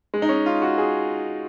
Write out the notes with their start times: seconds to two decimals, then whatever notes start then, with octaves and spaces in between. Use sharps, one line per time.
0.14 G#3
0.22 D#4
0.29 C#4
0.46 F4
0.62 F#4
0.78 G#4